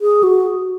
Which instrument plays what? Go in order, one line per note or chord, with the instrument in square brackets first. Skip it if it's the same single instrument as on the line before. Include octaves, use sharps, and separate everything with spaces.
[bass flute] G#4
F#4